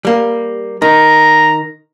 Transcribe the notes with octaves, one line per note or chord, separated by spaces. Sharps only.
G3 A#3
D#3 A#5